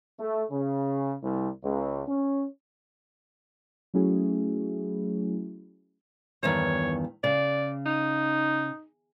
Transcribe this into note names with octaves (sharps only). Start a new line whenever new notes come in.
A3
C#3
C2
C#2
C#4
F#3 A3 C#4 E4 F#4 G#4
E2 G2 D#3 C#5
C#3 D5
D#4